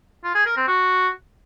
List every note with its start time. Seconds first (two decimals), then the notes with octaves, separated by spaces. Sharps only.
0.24 F4
0.35 G#4
0.46 A#4
0.57 C4
0.67 F#4